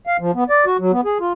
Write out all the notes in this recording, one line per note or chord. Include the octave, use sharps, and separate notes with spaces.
F5
F3
B3
D5
F#4
F#3
B3
G#4
F4